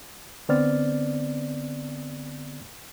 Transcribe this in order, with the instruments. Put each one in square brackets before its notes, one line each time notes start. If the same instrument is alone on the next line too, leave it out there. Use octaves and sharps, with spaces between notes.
[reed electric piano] D3 B3 C4 D5 F6 A6